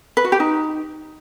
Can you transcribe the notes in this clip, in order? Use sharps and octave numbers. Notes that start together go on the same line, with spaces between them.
B4
F#4
G4
D#4